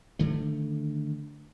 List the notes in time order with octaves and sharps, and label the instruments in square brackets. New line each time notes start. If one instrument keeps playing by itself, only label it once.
[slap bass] D3 D#3 A3